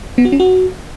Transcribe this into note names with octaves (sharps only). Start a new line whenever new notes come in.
B3
F#4
C#4
F#4